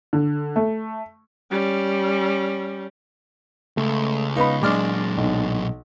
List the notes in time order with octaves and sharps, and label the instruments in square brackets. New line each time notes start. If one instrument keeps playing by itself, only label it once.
[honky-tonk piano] D3
A3
[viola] G3 C#4
[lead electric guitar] C#2 [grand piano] A3
[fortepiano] B3 D#4 [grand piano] F5 B5
[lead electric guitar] A#2 F#3 [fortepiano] G#3 D4 F6 [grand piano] D6
[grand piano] B1